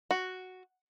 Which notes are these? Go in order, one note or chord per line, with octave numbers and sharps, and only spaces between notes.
F#4